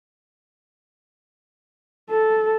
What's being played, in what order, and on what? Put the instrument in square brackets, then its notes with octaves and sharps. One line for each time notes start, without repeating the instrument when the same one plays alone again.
[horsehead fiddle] A4